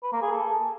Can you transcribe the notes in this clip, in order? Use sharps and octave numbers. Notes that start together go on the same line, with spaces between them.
B4
A#3
G#4
A4